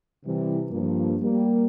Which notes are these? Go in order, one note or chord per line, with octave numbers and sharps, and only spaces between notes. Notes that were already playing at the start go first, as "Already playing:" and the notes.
C3 E3 G3
G2 F3 A#3
G3 A#3